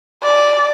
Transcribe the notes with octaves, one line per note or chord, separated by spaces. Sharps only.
D5